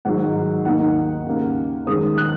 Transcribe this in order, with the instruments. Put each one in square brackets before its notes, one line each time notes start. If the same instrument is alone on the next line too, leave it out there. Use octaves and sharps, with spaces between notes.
[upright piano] G#2 D#3 F#3 F#5
D#2 D#3 A#3 D#4 F#5
D#2 C#3 A#3
F#2 D#3 G#3 C#4 D#6
F#6